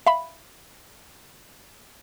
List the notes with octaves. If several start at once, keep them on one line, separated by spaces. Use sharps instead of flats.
E5 F5 B5